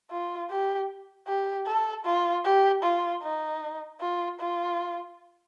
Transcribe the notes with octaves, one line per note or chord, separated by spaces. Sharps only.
F4
G4
G4
A4
F4
G4
F4
D#4
F4
F4